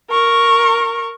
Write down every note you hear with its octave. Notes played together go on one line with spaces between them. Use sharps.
A#4 C#6